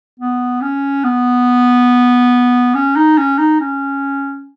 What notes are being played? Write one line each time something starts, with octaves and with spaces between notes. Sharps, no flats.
B3
C#4
B3
C#4
D#4
C#4
D#4
C#4